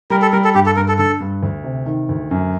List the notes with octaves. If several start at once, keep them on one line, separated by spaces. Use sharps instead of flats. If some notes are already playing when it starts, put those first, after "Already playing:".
G3 A#4
A4
G3 A#4
A4
G2 G4
A4
G2 A#4
A4
D3 A4
G2
D2
C3
D#3
D2
F#2